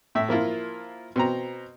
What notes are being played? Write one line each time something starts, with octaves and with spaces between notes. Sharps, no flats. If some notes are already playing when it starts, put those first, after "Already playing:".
A2 E5
F3 A#3 E4 F4
B2 C4 A#5